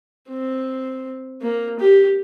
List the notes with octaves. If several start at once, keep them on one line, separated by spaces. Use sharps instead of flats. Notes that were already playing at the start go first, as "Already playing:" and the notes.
C4
A#3
G4